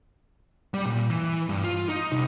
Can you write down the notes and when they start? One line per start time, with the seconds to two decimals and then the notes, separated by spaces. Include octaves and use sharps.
0.74 G3
0.86 A#2
1.10 E3
1.49 G2
1.64 F4
1.89 D#4
2.12 C2